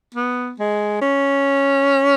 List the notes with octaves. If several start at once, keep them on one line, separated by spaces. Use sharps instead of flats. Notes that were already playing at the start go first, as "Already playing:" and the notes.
B3
G#3
C#4